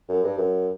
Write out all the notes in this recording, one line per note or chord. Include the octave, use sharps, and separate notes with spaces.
F#2
G2
F#2